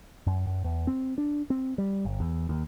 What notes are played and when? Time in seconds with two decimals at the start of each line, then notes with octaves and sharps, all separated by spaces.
0.27 F#2
0.47 F#2
0.64 E2
0.87 C4
1.18 D4
1.50 C4
1.78 G3
2.05 G1
2.20 E2
2.49 D#2